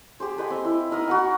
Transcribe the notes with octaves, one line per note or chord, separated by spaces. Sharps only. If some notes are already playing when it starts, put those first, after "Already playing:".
G4 G#4 C5
A4 B4 D#5 G#5
C4
E4
D#4 A#4 B4 D#6
F#4 A#4 F#5 G#5